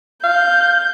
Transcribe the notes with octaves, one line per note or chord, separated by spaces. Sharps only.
F5 G6